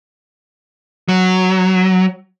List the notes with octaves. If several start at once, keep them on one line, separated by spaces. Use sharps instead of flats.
F#3